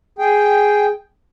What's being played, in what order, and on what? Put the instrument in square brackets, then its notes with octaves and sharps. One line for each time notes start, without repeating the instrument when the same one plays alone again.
[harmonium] G#4 G5